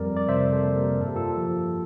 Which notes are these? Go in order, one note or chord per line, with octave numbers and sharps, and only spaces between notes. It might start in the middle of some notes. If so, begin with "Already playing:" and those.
Already playing: F2 G3 A#4 D5
D5
C3 C5 E5
A4 C5
A#3
G4 A#4
G2 A4
G4
F4 A4
F3